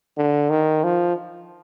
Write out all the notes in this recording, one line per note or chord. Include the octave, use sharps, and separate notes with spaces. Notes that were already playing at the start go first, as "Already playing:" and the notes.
D3
D#3
F3